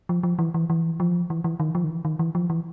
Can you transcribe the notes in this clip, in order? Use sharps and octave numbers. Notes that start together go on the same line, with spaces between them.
F3
F3
E3
E3
E3
F3
E3
E3
D#3
F3
D#3
E3
D#3
E3
F3
E3